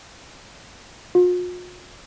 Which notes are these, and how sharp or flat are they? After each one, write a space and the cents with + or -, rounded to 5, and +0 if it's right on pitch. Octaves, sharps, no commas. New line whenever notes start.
F4 +45